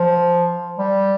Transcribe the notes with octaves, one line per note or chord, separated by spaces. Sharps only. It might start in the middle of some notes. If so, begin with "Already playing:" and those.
Already playing: F3
G3